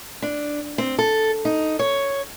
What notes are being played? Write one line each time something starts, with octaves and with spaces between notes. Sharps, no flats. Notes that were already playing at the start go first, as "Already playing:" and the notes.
D4
C4
A4
D#4
C#5